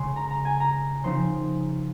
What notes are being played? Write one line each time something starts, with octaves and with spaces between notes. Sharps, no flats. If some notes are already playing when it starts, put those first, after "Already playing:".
Already playing: C#3 G#3 C#4 C6
A#5
A#5
G#5
A#5
C#3 F3 C4 D#4 C6